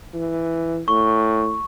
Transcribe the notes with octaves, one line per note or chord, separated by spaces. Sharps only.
E3
A2 C#6